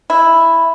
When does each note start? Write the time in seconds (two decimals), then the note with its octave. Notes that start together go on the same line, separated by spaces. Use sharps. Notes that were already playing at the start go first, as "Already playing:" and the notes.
0.10 E4